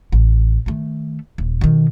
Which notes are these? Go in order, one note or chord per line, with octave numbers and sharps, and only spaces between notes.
A1
D#3 A3
D#1
B2 D#3